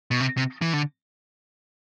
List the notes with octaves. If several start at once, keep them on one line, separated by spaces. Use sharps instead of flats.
B2
C3
C3
E3
D3